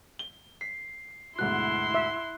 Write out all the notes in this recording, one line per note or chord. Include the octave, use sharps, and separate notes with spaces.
G7
B6 C7
D2 G#2 B2 E4 C6 F#6
E5